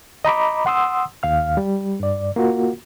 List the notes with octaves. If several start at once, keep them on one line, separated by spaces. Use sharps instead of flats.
D#5 A#5 B5 D6
F#5 C6 D#6 E6
D#2 F5 F6
G3
G2 D5
A#3 F4 F#4